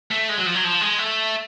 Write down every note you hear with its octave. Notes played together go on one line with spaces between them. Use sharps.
A3
G#3
F#3
F3
F#3
F3
G#3
A3